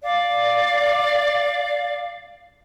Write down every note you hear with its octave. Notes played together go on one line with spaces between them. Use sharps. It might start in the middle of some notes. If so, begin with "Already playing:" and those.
D5 F5